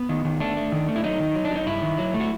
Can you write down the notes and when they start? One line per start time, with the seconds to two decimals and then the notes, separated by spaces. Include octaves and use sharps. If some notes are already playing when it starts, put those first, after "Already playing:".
Already playing: B3
0.09 D#3
0.25 D#3
0.40 A3 D4
0.56 A3
0.72 D#3
0.88 A3
0.96 E4
1.04 F#3 D#4
1.20 D#3
1.35 F#3
1.45 D4
1.51 F#3 D#4
1.67 G2 E4
1.82 D#3
1.98 F#3
2.14 A3
2.20 F#4